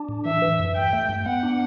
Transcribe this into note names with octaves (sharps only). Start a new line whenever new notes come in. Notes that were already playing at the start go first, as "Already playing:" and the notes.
Already playing: D4
A2
E3 E5
E3
F#2
G2 G5
A3
G2
B3 F#5
D4